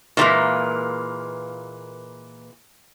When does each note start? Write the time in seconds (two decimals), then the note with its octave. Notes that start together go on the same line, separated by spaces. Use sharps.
0.17 A#2 D3 E3 F#3 G#3 A#3